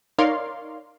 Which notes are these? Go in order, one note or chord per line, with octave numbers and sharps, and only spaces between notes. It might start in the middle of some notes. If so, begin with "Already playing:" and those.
D#4 A#4 C#5 D5 F5 C6